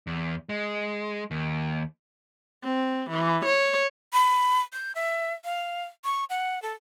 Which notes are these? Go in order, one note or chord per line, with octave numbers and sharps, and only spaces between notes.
E2
G#3
D#2
C4
E3
C#5
B5
G6
E5
F5
C#6
F#5
A4